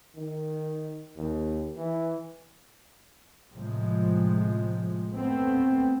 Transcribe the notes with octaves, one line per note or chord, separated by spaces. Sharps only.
D#3
D#2
E3
A2 C3 F3 G#3
A3 B3 C4